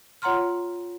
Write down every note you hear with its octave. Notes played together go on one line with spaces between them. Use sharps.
F4 C#5 F#5 A#5 C6 F6